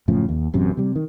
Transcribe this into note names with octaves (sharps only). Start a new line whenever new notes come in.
F#1 A2 C#3 F3
D#2
A1 F#2 C3
C3 G3
D#3